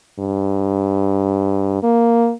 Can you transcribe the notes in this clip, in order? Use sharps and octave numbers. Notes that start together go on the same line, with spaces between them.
G2
A#3